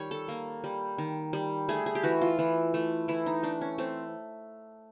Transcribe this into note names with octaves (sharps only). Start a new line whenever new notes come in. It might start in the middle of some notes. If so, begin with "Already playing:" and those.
Already playing: D#3 G3 C#5
A4
A#3
G3
D#3
G3
A3 G#4
G#4
G4
E3 F#4
F4
E3
A3
E3 E4
D#4
A3 D4
C#4
A3 C4